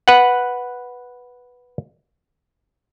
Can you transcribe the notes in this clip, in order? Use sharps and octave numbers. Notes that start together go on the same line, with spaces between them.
B4 F#5